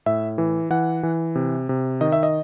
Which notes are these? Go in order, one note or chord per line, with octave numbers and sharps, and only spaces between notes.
A2 E5
E3
E3 F#5
E3
C3
C3
D#3 D#5
E5
D#5